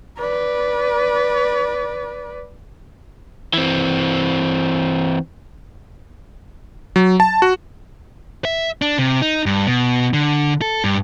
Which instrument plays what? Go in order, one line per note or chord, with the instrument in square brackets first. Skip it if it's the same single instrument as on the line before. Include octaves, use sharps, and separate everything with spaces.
[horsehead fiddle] B4 D5
[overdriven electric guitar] E3 C4
[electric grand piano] F#3
A5
F#4
[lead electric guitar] E5
D4
C3
D#4
G2
B2
D3
A4
G2